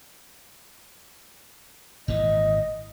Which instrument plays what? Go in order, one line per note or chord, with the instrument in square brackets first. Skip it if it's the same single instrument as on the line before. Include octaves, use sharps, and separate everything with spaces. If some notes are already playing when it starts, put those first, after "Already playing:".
[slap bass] G#1 A#2 E3 [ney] D#5